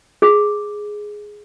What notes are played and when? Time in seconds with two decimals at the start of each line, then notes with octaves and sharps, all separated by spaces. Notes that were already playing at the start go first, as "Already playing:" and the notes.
0.22 G#4